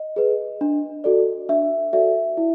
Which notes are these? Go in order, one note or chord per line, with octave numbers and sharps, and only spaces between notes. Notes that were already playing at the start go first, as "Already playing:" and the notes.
Already playing: D#5
G#4 B4
D4
F#4 A4 D5
D4 E5
F#4 A4 D5 E5
E4